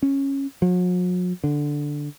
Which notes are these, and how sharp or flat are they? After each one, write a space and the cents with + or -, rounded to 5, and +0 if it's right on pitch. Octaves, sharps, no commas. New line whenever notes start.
C#4 -10
F#3 -45
D3 +0